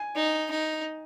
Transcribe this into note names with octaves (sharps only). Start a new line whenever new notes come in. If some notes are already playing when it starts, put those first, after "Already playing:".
Already playing: G#5
D#4
D#4